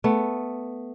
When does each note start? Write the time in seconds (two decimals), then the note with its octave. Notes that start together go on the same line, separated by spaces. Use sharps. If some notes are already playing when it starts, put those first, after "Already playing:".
0.04 A3 B3